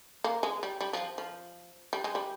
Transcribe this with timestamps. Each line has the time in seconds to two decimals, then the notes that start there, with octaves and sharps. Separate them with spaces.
0.24 A#3
0.43 G#3
0.63 G3
0.81 G3
0.93 F3
1.18 F3
1.93 G3
2.04 G#3
2.15 G3